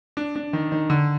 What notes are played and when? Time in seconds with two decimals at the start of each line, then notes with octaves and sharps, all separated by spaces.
0.17 D4
0.36 D4
0.53 D#3
0.72 D#3
0.90 D3